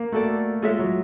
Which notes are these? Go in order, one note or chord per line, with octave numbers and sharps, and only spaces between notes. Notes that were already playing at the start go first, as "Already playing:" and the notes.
Already playing: A#3
A3 F#4 A4 D5
G#3 F4 A4 C#5 E5
F#3